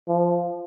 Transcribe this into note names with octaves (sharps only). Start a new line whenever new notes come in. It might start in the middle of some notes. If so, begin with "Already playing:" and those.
F3